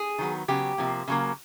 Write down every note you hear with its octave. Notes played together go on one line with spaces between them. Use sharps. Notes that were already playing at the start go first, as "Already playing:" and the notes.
Already playing: G#4
D#3 F#3 B3
C#3 F#3 B3 G4
C3 F3 A#3
C#3 F#3 A#3